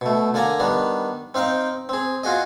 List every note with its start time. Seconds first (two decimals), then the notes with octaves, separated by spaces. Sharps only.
0.01 B2 A3
0.34 D3 A#3 D5 G#5 A#5
0.60 D#3 G3 B3 D4
1.34 C4 D#4 F5 G5
1.89 C4 G#4
2.23 F4 F#4 G#4 D#5